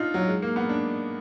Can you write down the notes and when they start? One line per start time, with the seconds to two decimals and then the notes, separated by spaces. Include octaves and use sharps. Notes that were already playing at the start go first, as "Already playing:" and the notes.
Already playing: D4 D#4 F4
0.14 F#3
0.28 G#3
0.42 A#3
0.56 B3
0.69 D4